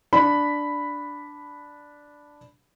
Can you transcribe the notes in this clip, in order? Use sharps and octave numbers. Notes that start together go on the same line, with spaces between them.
D4 B5